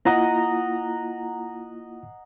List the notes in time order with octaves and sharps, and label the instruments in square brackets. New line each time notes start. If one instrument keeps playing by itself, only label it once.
[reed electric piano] A#3 E4 F4 [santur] D#5 F#5 A#5